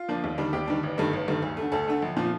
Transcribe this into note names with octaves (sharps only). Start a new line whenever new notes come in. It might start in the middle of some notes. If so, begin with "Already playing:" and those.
Already playing: F4
F3 A#3 D4
D#2
D#3 G3 D4
D#2 G4
D#3 G3 D4
A1
G2 D#3 A3
A1
G2 D#3 A3
D2
D3 A3
D2 A4
D3 A3
A#1
A#2 F3